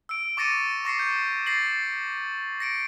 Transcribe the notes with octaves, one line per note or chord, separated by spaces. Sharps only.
E6 D7
C#6 D6 A6 A#6 C#7 D#7
C#6 A#6 C7 C#7
G6
A6 A#6 C7 F#7
A#6 C#7 D7